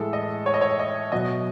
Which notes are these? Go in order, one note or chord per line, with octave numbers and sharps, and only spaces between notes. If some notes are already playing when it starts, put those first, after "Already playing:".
Already playing: A2 E3 G#3 A4
D#5
C#5
D#5
C#5
D#5
B2 F#3 D#5